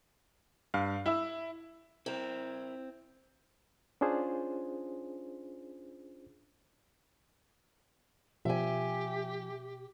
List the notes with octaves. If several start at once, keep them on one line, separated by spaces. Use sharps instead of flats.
G2 F5
E4 E5 E6
C4 E4 A#4
C#4 D4 F4 G#4 C5
B2 F3 G4 E5 G#5